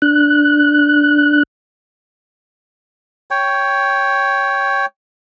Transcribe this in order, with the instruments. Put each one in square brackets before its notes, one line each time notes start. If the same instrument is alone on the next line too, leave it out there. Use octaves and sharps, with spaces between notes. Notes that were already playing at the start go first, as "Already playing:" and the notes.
[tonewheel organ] D4 F#6
[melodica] C#5 G5